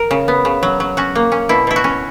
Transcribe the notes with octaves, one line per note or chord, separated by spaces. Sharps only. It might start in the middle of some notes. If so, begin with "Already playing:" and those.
Already playing: A#4
C#3
B3
C#3
F#3
F#3
C#4 F#4
A#3
C#4
B2 E4
B2 E4
F#4
C#4